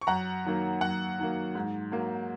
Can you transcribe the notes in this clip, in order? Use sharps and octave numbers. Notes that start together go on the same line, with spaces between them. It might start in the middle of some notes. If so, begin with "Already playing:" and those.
C#6
F#2 F#5 A#5
D#3 F#3 A#3
F#2 F#5
D#3 F#3 A#3
G#2
F#3 A#3